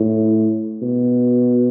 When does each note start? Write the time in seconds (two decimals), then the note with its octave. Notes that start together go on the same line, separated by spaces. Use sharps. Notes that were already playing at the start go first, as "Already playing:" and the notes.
Already playing: A2
0.82 B2